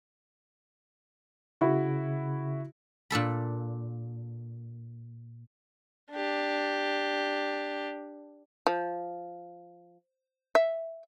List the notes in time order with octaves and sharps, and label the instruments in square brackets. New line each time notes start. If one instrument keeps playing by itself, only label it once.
[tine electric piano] C#3 [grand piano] E4 F#4
[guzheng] A#2 D4 A4 B5
[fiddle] D4 G4
[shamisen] F3
E5